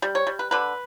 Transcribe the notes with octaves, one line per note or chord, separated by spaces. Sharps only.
G3
C#5
G3
B4
D3 B4